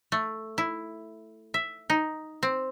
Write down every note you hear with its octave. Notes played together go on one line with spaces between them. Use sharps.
A3
E4
E5
D#4
C4